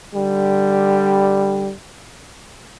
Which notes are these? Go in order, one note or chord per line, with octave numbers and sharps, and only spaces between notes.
D3 G3